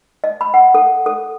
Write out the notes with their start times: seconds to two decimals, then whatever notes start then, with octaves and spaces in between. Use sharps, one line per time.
0.24 D#5
0.41 B5
0.54 F#5
0.75 A4
1.06 A4